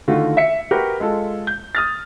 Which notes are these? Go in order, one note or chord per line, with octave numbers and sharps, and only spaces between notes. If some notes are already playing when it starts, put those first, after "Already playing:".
D3 D#3 A3 F4 F#4
E5 B6 C#7
F#4 G4 A#4 B4
G#3 F4 A4
G6
D#6 F6 A6